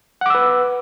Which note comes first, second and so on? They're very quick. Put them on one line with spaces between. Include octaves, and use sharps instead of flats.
F#5 D6 E6 B4